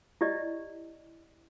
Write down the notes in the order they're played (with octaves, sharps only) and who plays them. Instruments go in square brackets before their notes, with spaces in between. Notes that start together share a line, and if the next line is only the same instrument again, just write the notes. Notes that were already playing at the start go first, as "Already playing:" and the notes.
[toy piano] E4 G4 D5 D#5